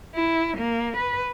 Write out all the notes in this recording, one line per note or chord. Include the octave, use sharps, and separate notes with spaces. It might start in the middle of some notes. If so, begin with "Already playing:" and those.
E4
A#3
B4